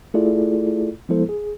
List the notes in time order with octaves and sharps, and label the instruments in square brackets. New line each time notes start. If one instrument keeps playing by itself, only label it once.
[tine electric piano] A3 E4 F4 G#4 A4 D5
F3 G#3 B3 E4 A4 C5
G#4